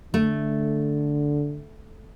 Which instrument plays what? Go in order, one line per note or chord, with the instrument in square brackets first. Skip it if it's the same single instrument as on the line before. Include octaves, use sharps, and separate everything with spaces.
[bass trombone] D3 [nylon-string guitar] A3